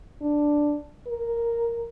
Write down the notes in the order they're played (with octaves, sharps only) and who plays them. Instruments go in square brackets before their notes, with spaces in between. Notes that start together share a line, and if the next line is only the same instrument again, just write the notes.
[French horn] D4
A#4